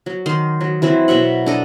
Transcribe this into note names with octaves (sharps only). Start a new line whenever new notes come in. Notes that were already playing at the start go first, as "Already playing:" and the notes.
F#3
D#3 C6
F#3
E3 F#3 C4 E4
B2 F#3 E5 F#5
D4 A4 D#5